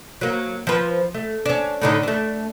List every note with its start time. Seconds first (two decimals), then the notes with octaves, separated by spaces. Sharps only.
0.21 F#3 A#3
0.67 F3 B4
1.14 A3
1.46 C#4 D4
1.82 A2 D3 D#4
2.03 A3 D4